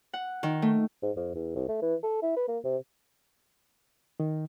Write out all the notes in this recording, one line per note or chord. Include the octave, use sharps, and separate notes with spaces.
F#5
D#3
A3
G#2
F2
E2
C2
A3
E3
A4
E4
B4
A#3
C3
D#3